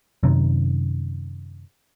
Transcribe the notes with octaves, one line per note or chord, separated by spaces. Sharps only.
F#2 C3 D#3